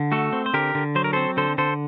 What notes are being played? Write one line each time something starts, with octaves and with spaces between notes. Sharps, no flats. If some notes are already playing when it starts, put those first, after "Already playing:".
Already playing: D3
A3 F#4 A4
C4
C5
D3 G4 A#4
D3
F#3 C5
A#4
C4 A4 C5
D3 A4 C5
D3 A4 C5